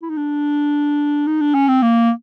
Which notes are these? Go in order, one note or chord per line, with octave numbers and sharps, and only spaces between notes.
E4
D#4
D4
D#4
D4
C#4
C4
A#3